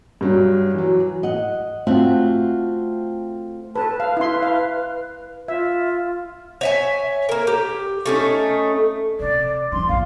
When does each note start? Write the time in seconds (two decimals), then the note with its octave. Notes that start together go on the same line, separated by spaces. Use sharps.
0.21 G2 F#3
0.74 E3 F#3
1.23 D#5 F#5
1.87 A3 C4 F4 F#4 E5 F#5
3.76 A4 B4 A5
4.00 B4 F5
4.17 E4 C6
4.43 F5
5.48 F4 E5
6.61 C#5 E5 G#5
7.29 A#3 A#4
7.47 G4
8.06 A3 C#4 D#4
9.20 C3 D5
9.72 F3 D#4 C6
9.89 A#1 E2 F5